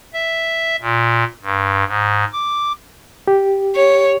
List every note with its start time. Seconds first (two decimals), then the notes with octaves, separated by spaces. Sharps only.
0.13 E5
0.82 A#2
1.43 G2
1.87 G#2
2.33 D6
3.28 G4
3.76 C#5